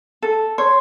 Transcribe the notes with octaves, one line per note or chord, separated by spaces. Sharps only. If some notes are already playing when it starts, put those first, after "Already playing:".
A4
C#5 C6